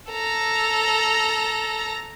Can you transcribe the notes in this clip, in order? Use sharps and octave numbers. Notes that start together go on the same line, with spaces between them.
A4 A#5